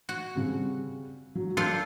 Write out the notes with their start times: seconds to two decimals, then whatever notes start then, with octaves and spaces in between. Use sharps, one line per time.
0.09 F#4
0.35 C#3 G3 C4
1.35 F#3
1.57 D4 F4 A4 A#4 G6